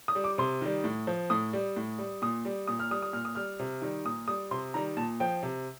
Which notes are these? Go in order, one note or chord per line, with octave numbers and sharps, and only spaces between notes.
D#6
G3
D6
C3 C6
D#3 G3
A2
F3
A2 D#6
G3
A2
G3
A#2 D#6
G3
A#2 D#6
F6
G3 D#6
D#6
A#2 F6
D#6
G3 F6
C3
D#3 G3
A#2 D#6
G3 D#6
C3 C6
D#3 G3 A#5
A#2 A5
F3 G5
C3